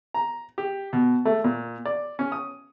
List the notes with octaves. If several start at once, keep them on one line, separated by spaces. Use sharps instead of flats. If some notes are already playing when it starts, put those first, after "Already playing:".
A#5
G4
B2
A3
A#2
D5
C#4
D#6